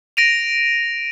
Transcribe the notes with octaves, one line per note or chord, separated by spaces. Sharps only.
A#6 D7 D#7 F7